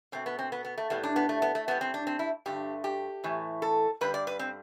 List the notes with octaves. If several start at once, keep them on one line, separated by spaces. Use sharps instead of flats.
B2 A3 C4
B3
C4
B3
B3
A3
A2 G3 B3
D4
B3
A3
B3
A3
A2 G3 B3
C4
D4
C4
E4
G2 D3 A3 G4
G4
A2 E3 A3
A4
G2 D3 G3 B4
D5
B4
C4